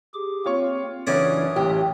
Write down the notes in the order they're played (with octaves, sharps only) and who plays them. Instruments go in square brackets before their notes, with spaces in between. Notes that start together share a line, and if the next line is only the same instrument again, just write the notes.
[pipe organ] G4 G#4 D6
[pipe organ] A#3 C4 [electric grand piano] F4 C#5 C#6
[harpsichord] F#2 C#4 D5 [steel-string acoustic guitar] C#3 E3 D4 [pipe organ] E5 D#6
[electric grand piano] A1 [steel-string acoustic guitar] G4